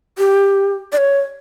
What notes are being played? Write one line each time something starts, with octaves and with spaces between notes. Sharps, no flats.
G4
D5
C#5